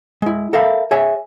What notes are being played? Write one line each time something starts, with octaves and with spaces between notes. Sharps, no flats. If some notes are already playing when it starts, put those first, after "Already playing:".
G#3 E4
A4 A#4 E5 F5 B5
G#4 C#5 E5 G#5